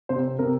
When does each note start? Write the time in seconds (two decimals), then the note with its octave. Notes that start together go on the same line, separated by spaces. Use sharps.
0.09 C3 C5
0.39 C3 A#4